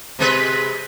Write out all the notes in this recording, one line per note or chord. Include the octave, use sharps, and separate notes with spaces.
C3 G#3 B4